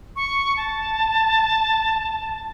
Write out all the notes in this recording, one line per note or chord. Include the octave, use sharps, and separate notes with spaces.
C#6
A5